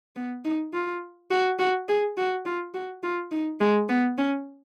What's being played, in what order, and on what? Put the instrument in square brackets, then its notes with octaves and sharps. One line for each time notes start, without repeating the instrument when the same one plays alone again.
[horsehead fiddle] B3
D#4
F4
F#4
F#4
G#4
F#4
F4
F#4
F4
D#4
G#3
B3
C#4